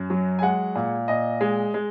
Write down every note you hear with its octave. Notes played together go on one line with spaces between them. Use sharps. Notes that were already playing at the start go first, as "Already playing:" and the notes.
Already playing: F#2
F#3
G#5
G#3 F#5
A#2
A#2 D#5
G#3
G#3